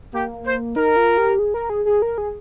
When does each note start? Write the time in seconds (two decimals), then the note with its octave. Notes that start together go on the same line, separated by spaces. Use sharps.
0.13 A#3 G4
0.45 C5
0.76 D#4 A#4
0.96 F4
1.17 G4
1.39 G#4
1.54 A#4
1.70 G#4
1.85 G#4
2.02 A#4
2.18 G#4